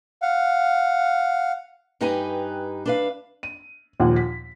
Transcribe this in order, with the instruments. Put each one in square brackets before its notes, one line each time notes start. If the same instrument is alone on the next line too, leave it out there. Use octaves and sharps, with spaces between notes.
[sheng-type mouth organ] F5 F#5
[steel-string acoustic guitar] G2 D#4 G4 B4 G#5 A#5
D4 B4 F5
[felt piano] D#7
D#2 A#2 F3 F#5
B6